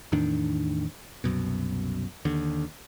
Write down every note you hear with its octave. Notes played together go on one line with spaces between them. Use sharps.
E2 A2 D#3 D4
C2 F#2 B2
D#2 D3